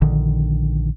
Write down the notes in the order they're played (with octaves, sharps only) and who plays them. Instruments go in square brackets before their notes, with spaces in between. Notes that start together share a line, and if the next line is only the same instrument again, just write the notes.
[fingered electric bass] A#1 D3 D#3